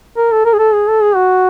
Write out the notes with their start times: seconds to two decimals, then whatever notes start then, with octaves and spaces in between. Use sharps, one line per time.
0.17 A#4
0.32 A4
0.45 A#4
0.53 G#4
0.59 A4
0.74 G#4
0.88 A4
1.02 G#4
1.16 F#4